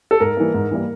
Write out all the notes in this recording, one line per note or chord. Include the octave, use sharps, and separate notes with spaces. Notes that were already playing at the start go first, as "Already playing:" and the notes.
A4
G#2 A#4
E3 G3 A#3
G#2
E3 G3 A#3